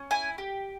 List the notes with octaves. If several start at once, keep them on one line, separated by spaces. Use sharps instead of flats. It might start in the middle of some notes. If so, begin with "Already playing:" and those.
Already playing: C#4
E4 G#5
G4